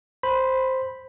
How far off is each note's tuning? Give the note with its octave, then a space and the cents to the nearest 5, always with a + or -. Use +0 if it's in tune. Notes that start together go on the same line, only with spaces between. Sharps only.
C5 +0 B5 +0